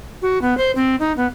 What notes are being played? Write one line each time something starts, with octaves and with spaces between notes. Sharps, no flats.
F#4
B3
C5
C4
D#4
B3